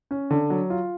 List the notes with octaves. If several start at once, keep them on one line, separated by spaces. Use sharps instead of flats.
C#4
D3
F#3
F4